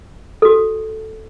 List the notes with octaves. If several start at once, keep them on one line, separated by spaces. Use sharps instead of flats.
F#4 A4